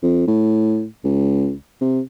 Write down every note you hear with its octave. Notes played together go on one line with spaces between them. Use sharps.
F2
A2
C#2
C3